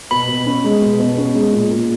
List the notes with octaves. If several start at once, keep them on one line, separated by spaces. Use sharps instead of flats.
B2 B5
B2
C#4
G#3
B2
B2
C#4
G#3
A#2
A#2